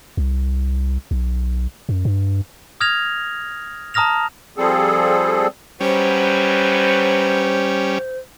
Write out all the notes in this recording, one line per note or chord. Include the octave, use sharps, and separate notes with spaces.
C2
B1
F#2
G2
D#6 F6 G#6 A#6 F7
A5 A#5 D#6 F6 A#6 F7
F3 G3 C4 G#4 A4
D2 F#3 G3 C#4 B4 C5